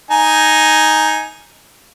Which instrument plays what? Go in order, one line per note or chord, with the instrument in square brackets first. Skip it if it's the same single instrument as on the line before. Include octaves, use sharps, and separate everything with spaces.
[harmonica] D#4 G#5